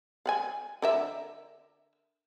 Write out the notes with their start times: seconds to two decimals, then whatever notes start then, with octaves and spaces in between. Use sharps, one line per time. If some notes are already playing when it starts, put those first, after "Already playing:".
0.26 F5 F#5 G#5
0.82 D3 A#4 E5